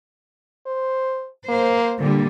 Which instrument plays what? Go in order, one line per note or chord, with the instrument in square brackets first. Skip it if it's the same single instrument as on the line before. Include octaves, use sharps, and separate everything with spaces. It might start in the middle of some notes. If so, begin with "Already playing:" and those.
[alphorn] C5
[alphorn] A#3 [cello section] C5
[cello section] A#2 D3 G3